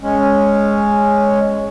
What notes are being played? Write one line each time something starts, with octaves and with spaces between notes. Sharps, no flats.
G#3 C#4